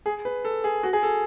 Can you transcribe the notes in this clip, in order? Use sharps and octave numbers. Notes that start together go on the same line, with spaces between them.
G#4
B4
A4
G#4
F#4
G#4
A4